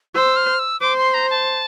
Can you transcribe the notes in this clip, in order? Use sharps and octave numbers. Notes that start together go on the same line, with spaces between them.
C5 E6
F6
E6
C5 D6
C6
A#5
A5